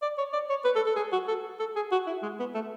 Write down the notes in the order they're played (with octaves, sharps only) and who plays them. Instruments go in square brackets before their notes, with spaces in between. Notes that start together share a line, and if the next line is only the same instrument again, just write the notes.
[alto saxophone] D5
C#5
D5
C#5
B4
A4
A4
G#4
F#4
A4
A4
G#4
F#4
E4
G#3
B3
A3